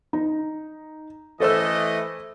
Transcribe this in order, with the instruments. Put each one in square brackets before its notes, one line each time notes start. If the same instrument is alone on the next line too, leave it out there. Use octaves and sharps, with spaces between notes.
[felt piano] D#4
[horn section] E3 A3 D#5 [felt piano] A4 C5 E6